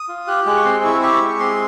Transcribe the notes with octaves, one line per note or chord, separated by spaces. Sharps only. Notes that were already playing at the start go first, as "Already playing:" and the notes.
Already playing: D#6
F4
G4 F#6
G#3 F#6
C#6
C4 C6
E4 C#6
G4 C#6
G#3
C4 C6